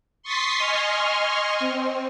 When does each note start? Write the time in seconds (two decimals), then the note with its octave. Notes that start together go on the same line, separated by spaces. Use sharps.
0.23 C6 C#6 D#6 A6 B6 C7
0.58 D#5 G#5 C6 C#6 F6
1.59 C4